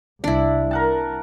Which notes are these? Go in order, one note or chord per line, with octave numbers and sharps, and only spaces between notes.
C2 D4 E4
A#4 F#5 A5